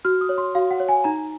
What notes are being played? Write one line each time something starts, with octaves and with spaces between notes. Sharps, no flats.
F#4 F6
D#6
C#5
C6
F#4 F5
F#5
C#5
G#5
D#4 A#5